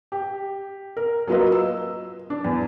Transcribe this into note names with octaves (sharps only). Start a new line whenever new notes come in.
G4
A#4
F#3 A#3 F4 B4 D#5
E6
D4
E2